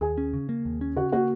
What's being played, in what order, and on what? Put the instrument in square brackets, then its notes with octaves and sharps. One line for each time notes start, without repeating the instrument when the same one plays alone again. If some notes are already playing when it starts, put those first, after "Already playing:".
[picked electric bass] D#2 [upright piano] G#4 G#5
[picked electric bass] C#4
C#3
A#3
D#2
C#4
[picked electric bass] C#3 [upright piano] F#4 F#5
[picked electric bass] A#3 [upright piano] F#4 F#5